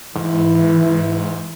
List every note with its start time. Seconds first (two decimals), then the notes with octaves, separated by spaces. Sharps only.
0.16 G#2 E3